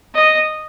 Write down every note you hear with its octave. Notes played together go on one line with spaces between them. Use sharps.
D#5